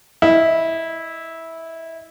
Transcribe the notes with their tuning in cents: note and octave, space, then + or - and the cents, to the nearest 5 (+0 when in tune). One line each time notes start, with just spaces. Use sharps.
E4 -15 D#5 +5